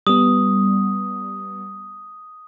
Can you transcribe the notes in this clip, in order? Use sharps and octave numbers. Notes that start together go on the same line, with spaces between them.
G3 B3 D#6